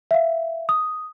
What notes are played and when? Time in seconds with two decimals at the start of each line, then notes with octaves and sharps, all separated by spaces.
0.11 E5 F5
0.69 D#6